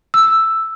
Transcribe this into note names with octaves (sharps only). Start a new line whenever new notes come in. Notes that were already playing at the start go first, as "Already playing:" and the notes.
E6